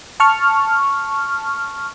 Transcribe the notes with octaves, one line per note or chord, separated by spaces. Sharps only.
A5 C#6 F6